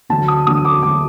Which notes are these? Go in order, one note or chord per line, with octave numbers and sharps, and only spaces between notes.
D2 D3 F#3 A5
D#6
D2 D3 F#3 D#6
D6
D2 D3 F#3 D6